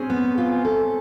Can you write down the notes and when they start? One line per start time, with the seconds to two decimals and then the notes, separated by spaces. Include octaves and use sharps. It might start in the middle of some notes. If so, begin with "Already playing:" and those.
Already playing: C4 C#4 G#4
0.10 B3
0.38 F4
0.65 A4